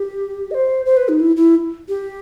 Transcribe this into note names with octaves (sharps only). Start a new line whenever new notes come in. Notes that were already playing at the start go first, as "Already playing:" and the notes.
Already playing: G4
D#5
C5
C5
B4
D#4
E4
E4
G4